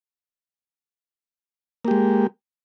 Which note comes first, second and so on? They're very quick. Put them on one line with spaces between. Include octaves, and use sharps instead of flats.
A#3 G4 G#3